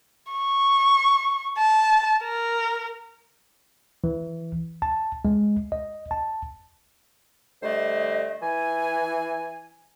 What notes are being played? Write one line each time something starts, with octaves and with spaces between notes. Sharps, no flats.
C#6
A5
A#4
E3
A5
G#3
D#5
A5
D3 G3 A3 C5 D#5
E3 G#5